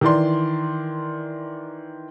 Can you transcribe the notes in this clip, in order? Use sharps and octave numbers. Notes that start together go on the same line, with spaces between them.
D#3 E3 D5 C6